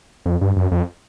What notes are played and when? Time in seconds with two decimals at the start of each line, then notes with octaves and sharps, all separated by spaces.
0.26 F2
0.41 G2
0.56 F#2
0.72 F2